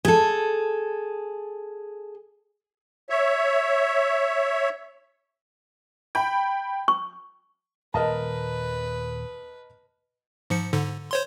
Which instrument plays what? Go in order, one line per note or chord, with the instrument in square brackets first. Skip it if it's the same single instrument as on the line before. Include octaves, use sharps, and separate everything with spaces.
[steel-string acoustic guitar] G#4 A4
[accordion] C#5 E5
[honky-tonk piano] G5 B5
[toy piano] C#6
[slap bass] D#1 [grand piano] A#4 D#5 A5 [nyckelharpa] B4
[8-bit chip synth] G#2 F3 C#7
G#2 D3
C5 C#5 C6